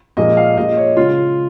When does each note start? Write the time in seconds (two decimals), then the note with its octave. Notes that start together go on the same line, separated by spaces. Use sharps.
0.17 A#2 F3 G#3 D#5
0.37 F5
0.57 A#2 G#3 D#5
0.77 C#5
0.97 C#3 G#3 F4